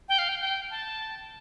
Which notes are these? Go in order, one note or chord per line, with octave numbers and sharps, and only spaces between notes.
G5
F5
G5
G5
A5